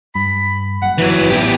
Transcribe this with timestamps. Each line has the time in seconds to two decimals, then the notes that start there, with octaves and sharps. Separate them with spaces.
0.15 G2 B5
0.82 F#1 F#5
0.98 E3 F#3 B4
1.30 A1 E2 G4